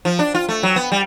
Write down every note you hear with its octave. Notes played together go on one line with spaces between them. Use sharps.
F3
D4
F4
A3
F#3
B3
G3